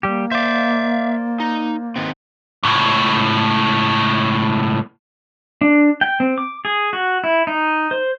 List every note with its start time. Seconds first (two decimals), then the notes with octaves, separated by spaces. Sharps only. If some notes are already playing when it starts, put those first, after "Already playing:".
0.03 G3 A#3 G4
0.32 C5 D5 E5 F5
1.40 D#4
1.96 D#3 B3 C4
2.63 C#2 A2
5.61 D4
6.01 G5
6.20 C4
6.38 D6
6.65 G#4
6.93 F#4
7.24 E4
7.47 D#4
7.91 C5